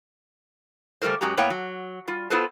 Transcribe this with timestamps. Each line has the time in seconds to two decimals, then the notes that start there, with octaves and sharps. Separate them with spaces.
1.01 C#3 G3 A3 F#4 A#4 C5
1.21 F#2 G#3 C#4 F#4 G4 A#5
1.37 A2 A#3 B3 C#5 F#5 G5
1.50 F#3
2.07 G3 F4
2.30 B3 E4 F4 A4 B4 C5